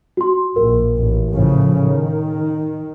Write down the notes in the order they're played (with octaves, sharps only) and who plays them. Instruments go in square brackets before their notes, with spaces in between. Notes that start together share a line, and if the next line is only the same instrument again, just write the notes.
[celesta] F#4 C6
[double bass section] A#1 [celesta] A#4
[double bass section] A1
A2 C#3 F3
D#3